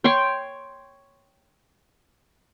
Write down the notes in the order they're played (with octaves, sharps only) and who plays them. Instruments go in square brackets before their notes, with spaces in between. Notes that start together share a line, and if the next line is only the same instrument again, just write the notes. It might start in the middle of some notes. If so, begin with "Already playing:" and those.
[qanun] C#5 G5 C6 C#6